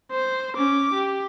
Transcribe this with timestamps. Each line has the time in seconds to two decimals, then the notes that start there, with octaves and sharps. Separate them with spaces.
0.12 C5
0.57 C#4 D6
0.94 G4